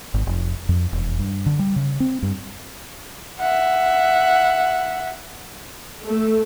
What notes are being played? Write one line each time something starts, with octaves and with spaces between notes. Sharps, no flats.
G#1
F1
F2
E1
G2
D3
G3
C#3
C4
G2
E5 F#5
A3